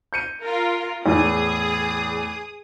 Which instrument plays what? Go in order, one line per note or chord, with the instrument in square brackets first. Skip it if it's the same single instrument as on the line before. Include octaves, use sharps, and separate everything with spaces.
[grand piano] G6 C#7 D#7
[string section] F4 A#4
[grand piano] E2 A2 [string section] G#4 D#6